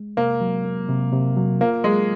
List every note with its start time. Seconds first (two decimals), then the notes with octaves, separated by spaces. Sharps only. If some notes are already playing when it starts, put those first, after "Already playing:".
Already playing: G#3
0.17 C3 A#3
0.41 F#3
0.65 A#3
0.89 C3
1.12 C3
1.36 F#3
1.61 A#3 F4
1.84 F#3 G#3